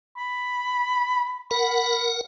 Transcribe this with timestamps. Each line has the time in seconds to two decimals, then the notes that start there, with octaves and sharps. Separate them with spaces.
0.17 B5
1.51 A#4 F#5 B5